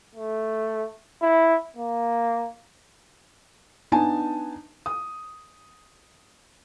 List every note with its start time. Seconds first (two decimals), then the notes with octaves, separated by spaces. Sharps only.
0.15 A3
1.22 E4
1.76 A#3
3.92 B3 D4 D#4 G#5 A5
4.86 D#6